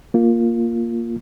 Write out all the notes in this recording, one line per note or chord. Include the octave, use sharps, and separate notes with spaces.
A#3 F4